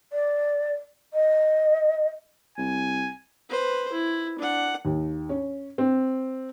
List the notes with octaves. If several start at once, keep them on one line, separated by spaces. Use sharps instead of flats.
D5
D#5
C2 G#5
B4 C5
E4
D4 F#5
D#2
C#4
C4